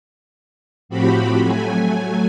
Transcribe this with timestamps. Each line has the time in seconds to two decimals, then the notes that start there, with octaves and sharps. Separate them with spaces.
0.89 A2 F3 C4 F#4 G4 B5
1.41 F#3 A3 G#5